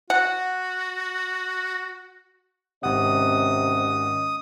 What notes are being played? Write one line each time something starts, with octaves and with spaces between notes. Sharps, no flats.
F#4 F#5
G#1 C3 C#4 D#5 F#5 D#6